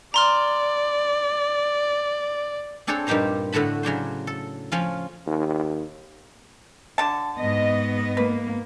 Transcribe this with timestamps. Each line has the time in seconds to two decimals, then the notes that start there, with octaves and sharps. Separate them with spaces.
0.14 D5 A#5 C6 F6
2.87 C4 D4 G#4 A4 C5 C#5
3.07 G2 A#2 D#4 G4 C5 A#5
3.52 A2 D3 F#4 A5 B5
3.83 C#3 F#3 D4 C5
4.27 A4
4.72 F3 C#4 F4
5.27 D#2
6.98 D3 A5
7.39 G#2 B3 D#5
8.17 A#3 B4